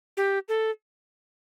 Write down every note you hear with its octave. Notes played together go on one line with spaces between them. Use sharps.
G4
A4